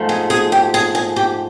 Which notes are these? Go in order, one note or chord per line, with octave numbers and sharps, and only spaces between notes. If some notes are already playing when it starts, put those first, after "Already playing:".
Already playing: G#2 F3 A3
G#4
G#4
G4
G#4
G#4
G4